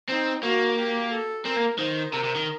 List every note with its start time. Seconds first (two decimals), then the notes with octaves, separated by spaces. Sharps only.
0.09 C4 D#4
0.42 A#3 F#4
0.77 G4
1.11 A4
1.45 C4 A#4
1.57 A#3
1.79 D#3 C5
2.13 C3 A#4
2.24 C3
2.35 D#3